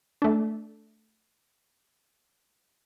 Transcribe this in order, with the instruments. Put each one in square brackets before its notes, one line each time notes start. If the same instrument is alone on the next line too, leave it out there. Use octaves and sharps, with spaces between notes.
[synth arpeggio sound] A3 D4